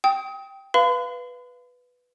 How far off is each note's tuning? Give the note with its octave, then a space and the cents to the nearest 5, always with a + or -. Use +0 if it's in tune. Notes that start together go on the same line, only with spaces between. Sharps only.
G5 +0 D#6 +30
B4 +0 F5 -10 B5 +45